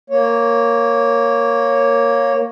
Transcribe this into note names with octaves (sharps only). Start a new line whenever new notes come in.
A#3 C#5